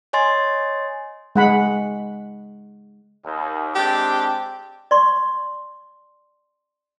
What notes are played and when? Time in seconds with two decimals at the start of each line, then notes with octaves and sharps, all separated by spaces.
0.13 C#5 D#5 G#5 C6 A6
1.36 G#3 F#5 B5
3.24 D#2
3.75 G#3 C4 D4 G4
4.91 D5 C6 C#6